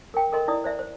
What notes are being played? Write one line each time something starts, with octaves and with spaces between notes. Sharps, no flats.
A#4 G5
A4 A#4 D#5 C6
E4 D5 D#6
C5 D5 E5
C5